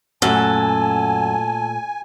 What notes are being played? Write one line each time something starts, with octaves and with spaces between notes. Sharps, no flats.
F#2 A#2 A3 A4 G#5 F#6